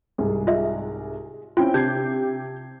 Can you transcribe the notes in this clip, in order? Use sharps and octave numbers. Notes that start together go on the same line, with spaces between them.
C2 G#2 G#4
F4 D#5 E5
C4 C#4 E4 F4 G5
C3 D4 G4 A5 G6 G#6 C7